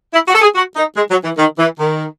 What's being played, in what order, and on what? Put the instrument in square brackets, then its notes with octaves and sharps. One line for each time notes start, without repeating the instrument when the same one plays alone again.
[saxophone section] E4
F#4
A4
G#4
F#4
D#4
G#3
F#3
E3
D#3
E3
D#3